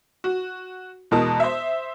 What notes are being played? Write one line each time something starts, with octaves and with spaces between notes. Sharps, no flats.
F#4
E2 B2 G#3 A#4 A5 D#6
C5 E5